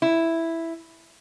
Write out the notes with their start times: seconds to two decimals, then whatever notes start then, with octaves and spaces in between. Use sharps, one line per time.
0.02 E4